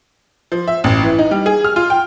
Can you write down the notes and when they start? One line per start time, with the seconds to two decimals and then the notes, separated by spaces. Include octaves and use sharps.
0.52 F3
0.68 E5
0.84 A1
1.03 E3
1.19 D#4
1.31 G3
1.46 G#4
1.64 F6
1.76 F4
1.90 G5